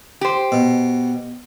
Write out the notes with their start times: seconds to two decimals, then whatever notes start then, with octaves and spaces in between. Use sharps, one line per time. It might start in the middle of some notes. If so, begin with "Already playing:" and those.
0.21 G4 C5
0.52 B2